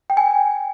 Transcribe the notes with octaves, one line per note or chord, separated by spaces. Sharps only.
G5
G#5